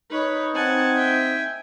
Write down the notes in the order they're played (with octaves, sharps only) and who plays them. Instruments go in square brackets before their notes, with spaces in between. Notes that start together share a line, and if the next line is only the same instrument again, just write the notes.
[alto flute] D#4 [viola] B4 C#5
[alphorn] C4 [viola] F#5 A5 [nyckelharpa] G#5
[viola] E5 G5